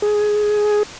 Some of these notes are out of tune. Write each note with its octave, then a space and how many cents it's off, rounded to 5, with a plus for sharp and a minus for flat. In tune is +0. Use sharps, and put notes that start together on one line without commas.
G#4 +10